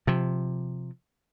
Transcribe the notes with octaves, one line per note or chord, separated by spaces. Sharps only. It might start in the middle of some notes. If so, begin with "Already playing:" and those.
C3 F3